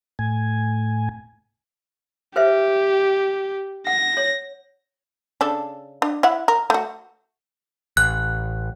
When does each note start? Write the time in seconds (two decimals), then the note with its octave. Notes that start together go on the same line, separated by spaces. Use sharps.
0.19 A2 G#5
2.36 G4 B4 C5 E5
3.87 F#5 A#6
4.17 C#5
5.41 C#3 D4 A4
6.02 D4
6.23 E4 E5 F#5
6.48 A#4
6.70 A3 F#4
7.97 A1 F#6